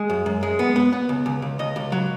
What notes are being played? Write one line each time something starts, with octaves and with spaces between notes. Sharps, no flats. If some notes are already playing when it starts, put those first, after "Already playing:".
Already playing: G#3
F#2
F#2
G#3
B3
B3
B3
C#2
C#2
C#2
C#2 D#5
C#2
F#3